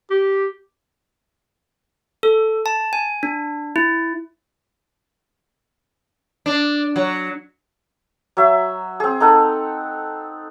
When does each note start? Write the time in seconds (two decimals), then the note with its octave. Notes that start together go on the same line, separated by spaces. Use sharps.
0.11 G4
2.23 A4
2.66 A5
2.93 G#5
3.23 D4
3.76 E4
6.46 D4
6.96 F#3
8.37 F#3 E5
9.00 C4 G#4
9.20 D#4 A4 F#5